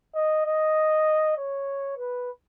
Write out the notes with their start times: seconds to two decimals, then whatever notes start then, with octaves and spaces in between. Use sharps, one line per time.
0.14 D#5
0.45 D#5
1.37 C#5
1.97 B4